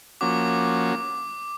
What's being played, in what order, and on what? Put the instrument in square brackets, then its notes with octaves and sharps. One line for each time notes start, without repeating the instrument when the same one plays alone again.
[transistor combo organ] F3 A#3 C#4 F#4 [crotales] D6